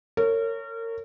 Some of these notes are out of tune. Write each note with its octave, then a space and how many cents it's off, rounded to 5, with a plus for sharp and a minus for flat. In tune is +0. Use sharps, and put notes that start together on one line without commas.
A#4 -35 C#5 +0